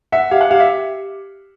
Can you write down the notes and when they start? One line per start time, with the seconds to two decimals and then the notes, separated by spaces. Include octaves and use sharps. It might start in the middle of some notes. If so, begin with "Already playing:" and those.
0.12 E5 F#5
0.31 G4 F5
0.41 F#5
0.51 G4 F5
0.60 E5